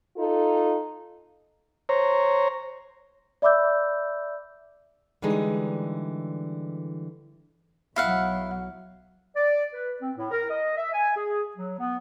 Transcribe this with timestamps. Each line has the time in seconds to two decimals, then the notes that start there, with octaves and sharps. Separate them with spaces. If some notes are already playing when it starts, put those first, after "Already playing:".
0.17 D#4 F4 A4
1.89 C5 C#5 A#5
3.42 D5 E5 B5 D6 E6 G6
5.22 D3 E3 G3 G#3 D#4
7.96 B1 F#3 E4 F5 F#5
9.36 D5
9.74 B4
10.02 C4
10.16 A2
10.31 A#4
10.50 D#5
10.77 E5
10.93 G#5
11.16 G#4
11.57 F#3
11.79 B3